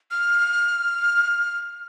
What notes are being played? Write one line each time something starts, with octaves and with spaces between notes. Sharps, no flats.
F6